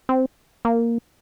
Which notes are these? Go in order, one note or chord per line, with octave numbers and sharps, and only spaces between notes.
C4
A#3